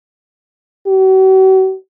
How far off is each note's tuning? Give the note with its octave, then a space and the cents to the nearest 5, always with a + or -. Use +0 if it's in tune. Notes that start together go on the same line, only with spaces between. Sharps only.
F#4 +45